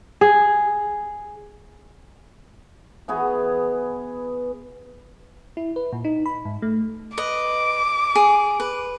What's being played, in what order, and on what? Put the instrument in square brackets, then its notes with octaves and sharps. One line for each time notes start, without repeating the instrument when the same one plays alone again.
[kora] G#4
[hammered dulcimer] E3 B3 F#4 G#4
[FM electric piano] E4
B4
A#2
D#4
B5
G#2
A3
[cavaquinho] B4 D#5 [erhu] D6
[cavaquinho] G#4
B4